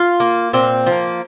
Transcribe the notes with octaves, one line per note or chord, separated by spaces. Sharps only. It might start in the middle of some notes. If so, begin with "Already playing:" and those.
Already playing: F4
A#3
A#2 C4
F3
A#3